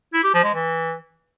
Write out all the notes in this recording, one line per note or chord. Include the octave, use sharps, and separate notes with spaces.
E4
G4
F3
G#3
E3